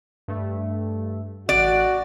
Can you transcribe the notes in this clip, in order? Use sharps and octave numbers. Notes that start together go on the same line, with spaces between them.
G2 A3
A1 F#4 D5 F#6